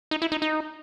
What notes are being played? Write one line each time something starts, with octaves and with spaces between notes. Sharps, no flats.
D#4
E4
D#4
D#4